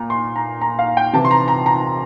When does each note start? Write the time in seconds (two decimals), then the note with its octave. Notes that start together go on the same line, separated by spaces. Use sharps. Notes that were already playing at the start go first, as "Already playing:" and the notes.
Already playing: A#2 A#5
0.10 C6
0.36 A#5
0.61 A#5
0.79 F5
0.97 G5
1.13 C3 E3 A5
1.25 C6
1.31 A#5
1.48 A#5
1.66 A#5